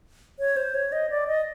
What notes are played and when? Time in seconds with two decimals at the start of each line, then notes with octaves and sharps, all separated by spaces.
0.39 C#5
0.56 C5
0.75 C#5
0.92 D#5
1.10 D5
1.27 D#5